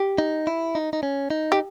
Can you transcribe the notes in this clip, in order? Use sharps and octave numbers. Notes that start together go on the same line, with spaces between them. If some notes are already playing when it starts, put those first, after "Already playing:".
Already playing: G4
D#4
E4
D#4
D#4
C#4
D#4
G4